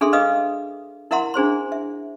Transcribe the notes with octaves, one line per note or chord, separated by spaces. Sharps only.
D4 G#4 A4 E5 C6
B4 D#5 F5 D6 D#6
E4 A#4 E5 F#5 A#5 C6
D4 G#4 C5 C6
E5